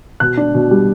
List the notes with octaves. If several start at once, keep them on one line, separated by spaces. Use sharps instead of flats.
B2 F#6
D4
B2
G3